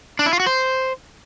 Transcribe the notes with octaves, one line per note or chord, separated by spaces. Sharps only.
D4
E4
F4
F#4
C5